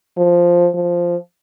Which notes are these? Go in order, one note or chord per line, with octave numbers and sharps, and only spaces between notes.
F3
F3